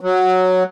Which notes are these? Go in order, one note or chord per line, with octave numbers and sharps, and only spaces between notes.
F#3